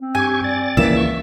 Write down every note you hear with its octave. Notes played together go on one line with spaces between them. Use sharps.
C4
G2 G4 G#5 C#6
D5 A6
C#2 E3 A#3 E5
C#6